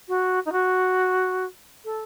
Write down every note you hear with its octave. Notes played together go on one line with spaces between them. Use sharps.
F#4
D#4
F#4
A4